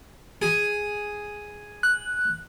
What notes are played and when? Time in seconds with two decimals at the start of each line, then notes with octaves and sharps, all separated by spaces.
0.42 G#4
1.83 F#6